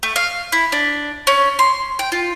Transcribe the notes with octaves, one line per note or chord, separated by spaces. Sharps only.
A3
F5
E4
D4
C#4
C6
G5
F4